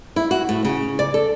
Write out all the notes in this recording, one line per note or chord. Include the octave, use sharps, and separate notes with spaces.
E4
F#4
A2
C#3
D5
A4